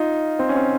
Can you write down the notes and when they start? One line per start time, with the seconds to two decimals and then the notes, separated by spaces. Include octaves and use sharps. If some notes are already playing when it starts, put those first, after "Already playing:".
Already playing: D#4 F4
0.39 C4
0.49 C#4
0.56 C4